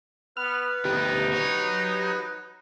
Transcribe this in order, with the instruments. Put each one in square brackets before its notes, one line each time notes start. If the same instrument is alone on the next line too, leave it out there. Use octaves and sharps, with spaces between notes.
[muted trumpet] B3 [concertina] B4 [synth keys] F6
[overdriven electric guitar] D2 B3 [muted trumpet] D#4 [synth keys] G4
[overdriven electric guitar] F#4 C#5